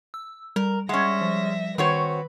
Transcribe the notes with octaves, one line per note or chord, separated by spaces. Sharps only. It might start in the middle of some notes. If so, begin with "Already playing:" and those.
E6
G3 A#4
G3 G#3 C#4 E5 F#5 A#6
F3
D#3 C4 F#4 B4 C#5